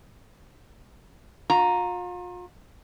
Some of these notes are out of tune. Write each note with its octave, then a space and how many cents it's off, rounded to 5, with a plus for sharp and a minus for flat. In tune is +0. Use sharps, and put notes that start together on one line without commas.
F4 +40 A#5 +0